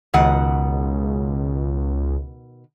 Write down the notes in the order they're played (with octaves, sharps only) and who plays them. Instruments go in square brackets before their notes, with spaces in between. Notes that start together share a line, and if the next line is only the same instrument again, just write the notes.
[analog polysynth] C#2 [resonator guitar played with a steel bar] B2 D#3 F#5